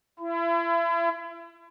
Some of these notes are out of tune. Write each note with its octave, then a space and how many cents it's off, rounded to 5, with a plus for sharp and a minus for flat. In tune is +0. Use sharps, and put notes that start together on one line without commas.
E4 +35